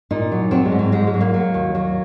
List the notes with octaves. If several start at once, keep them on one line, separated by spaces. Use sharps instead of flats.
A#2 D#4
F#3
F#3 C4
G#3
G#2
F#3
G#2 G#3
G#3
F#3
A#3
F#3
D#2
F#3